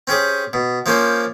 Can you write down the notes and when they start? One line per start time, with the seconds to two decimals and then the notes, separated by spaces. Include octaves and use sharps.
0.07 C4 C#4 G4 G#4
0.53 B2
0.86 F3 A#3 C#4 C5